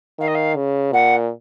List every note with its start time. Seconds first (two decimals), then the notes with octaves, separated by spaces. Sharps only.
0.19 D#3 F5
0.27 D#5
0.34 F5
0.56 C#3
0.93 A#2 F#5